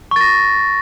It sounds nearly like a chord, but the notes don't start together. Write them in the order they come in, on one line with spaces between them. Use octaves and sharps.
C#6 A6 A#6